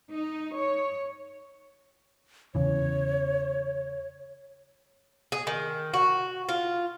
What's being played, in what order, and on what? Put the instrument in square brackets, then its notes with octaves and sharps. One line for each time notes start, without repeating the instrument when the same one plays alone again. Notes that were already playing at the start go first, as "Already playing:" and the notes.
[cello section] D#4
C#5
[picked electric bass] E2 C#3 E3 [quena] C#5
[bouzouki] G#4
D#3
F#4
F4